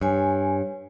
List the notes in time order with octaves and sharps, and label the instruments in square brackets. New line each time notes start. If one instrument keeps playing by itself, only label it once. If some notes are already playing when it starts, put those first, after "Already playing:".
[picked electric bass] G2 [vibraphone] C#5 G#5